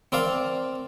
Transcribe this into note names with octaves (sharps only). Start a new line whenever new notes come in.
C4 A#4 D5 F5